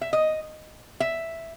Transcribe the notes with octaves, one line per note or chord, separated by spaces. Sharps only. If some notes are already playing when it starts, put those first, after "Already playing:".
E5
D#5
E5